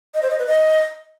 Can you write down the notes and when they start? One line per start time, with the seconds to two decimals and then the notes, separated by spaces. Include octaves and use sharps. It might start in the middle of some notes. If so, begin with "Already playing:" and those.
0.14 D#5
0.22 C5
0.30 D#5
0.39 B4
0.47 D#5